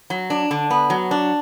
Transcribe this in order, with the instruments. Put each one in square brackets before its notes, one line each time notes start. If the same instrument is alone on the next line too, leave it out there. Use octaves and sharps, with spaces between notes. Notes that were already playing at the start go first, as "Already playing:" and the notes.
[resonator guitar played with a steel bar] F#3
D4
D3
B3
F#3
D4